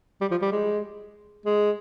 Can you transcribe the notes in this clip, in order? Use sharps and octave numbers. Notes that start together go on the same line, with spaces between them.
G3
F3
G3
G#3
G#3